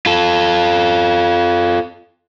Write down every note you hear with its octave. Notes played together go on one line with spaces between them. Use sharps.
F4 A4